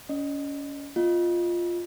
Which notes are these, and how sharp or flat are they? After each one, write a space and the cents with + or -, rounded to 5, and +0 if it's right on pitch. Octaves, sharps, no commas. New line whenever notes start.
C#4 +30 D#5 -20
B3 +0 F4 +0 D#5 +0